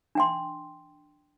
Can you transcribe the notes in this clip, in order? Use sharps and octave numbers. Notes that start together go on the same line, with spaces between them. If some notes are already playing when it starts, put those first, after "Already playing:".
D4 G5 C6